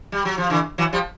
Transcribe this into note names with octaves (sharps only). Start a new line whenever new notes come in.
G3
F#3
F3
D3 E3
E3 F#3
F3 G3